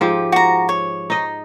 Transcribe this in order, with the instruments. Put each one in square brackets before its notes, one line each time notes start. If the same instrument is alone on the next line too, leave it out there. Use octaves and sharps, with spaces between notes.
[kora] G#2 F3 G4
[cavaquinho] F#4 A#5
C#5
[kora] D#4 D#5